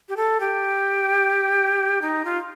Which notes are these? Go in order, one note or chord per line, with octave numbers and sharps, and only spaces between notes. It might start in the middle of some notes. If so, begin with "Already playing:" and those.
G4
A4
G4
D#4
F4